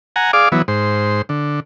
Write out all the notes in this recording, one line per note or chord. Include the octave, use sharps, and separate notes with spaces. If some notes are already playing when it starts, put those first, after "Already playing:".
F#5 G#5 A#5
G#4 D5 F5 D6
E3 F#3 B3
G#2 C5
D3